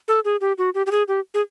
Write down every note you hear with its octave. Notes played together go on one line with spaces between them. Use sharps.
A4
G#4
G4
F#4
G4
G4
G#4
G4
G#4